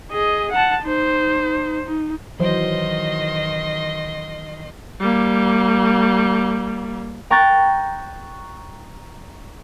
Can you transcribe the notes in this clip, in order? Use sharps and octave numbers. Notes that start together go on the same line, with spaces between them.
G#4 D#5
F#5 A5
D#4 C5
D#4
D#3 E3 F#3 C5 D#5 C6
G3 A#3
G5 A#5 C#6 F#6 G6 A6